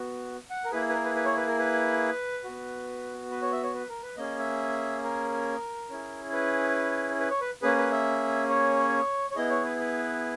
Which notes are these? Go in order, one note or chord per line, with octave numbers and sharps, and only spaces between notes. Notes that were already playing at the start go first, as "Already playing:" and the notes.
Already playing: B3 F#4
F#5
A#4
A#3 E4 G#4 B4
B4
A#4
B4
B4
C#5
B4
A#4
B4
B3 F#4
B4
C#5
E5
C#5
B4
A#4
B4
A#3 C#4 G#4 D#5
E5
A#4
C#4 E4 G#4
B4
B4
C#5
B4
A#3 C#4 G#4 B4
B4
E5
C#5
C#5
B3 E4 G#4 D#5
C#5
B4
B4